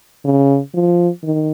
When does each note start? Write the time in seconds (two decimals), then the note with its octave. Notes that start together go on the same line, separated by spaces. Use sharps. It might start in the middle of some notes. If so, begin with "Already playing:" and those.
0.24 C#3
0.74 F3
1.23 D#3